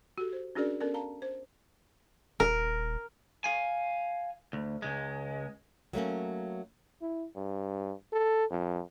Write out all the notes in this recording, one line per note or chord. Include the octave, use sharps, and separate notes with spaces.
F#4 G4 A4
C5
C#4 D4 F#4 G#4 A#4 D5
B3 C#4 A4 A#4 D5
F5 A5 A#5
C5
D#1 A#4
F5 G#5
D2
C#2 G#3
F#3 A3 A#3 C#4
E4
G2
A4
F2